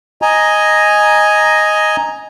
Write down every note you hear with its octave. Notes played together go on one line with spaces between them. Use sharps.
D#5 G#5 A#5